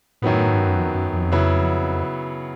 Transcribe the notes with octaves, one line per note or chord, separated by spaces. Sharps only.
F#2 A2 D#3 F#3 B3
G#2
G2
F#2
F2
F#2
F2
C#3 F#3 B3 E4